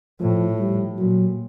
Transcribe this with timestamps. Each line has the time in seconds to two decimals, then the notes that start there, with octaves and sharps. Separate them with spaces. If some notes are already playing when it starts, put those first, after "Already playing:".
0.20 A2 F3
0.59 G3
0.98 A#2 F#3